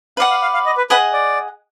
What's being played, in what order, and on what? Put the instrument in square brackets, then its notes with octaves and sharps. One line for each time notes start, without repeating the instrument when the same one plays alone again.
[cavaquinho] B4 D5 F#5 [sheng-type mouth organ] F5
[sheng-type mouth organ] F5
F5
F5
D#5
B4
[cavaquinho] G#4 D#5 F#5 [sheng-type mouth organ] B4
[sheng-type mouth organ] D5